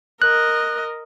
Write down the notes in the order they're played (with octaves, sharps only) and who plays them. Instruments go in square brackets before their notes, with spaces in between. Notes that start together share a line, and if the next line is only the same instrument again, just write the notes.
[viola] A#4 D#5 [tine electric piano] F#6